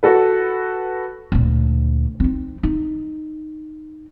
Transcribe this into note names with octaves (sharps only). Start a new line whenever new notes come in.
F#4 A4 B4
D2 A#2
C4 D#4
D#4